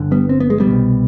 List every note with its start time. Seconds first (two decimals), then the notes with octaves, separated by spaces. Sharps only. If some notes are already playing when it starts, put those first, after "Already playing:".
Already playing: G1 D3
0.11 G3 B3
0.29 C4
0.40 B3
0.50 G#3
0.60 G3 B3
0.67 C2 B2